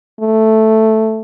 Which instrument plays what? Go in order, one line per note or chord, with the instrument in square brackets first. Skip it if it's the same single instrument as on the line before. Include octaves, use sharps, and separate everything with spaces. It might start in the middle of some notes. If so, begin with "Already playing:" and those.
[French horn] A3